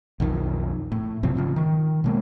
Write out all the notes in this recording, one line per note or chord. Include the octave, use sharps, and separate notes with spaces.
B1 F2 D#3 F3
A2
G2 C3 F3 C4
G#2 C#3 F3
D#3
B2 G#3 A#3